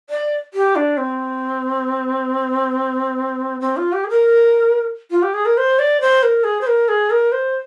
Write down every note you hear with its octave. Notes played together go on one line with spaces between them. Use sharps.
D5
G4
D4
C4
C4
F4
G4
G#4
A#4
F4
G4
G#4
A#4
C5
D5
C5
A#4
G#4
C5
A#4
G#4
A#4
C5